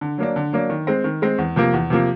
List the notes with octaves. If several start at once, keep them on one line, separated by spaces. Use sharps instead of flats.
D3
F#3 A#3 D4
D3
F#3 A#3 D4
D#3
G#3 C4
D#3
G#3 C4
E2
C3 F3 A#3
E2
C3 F3 A#3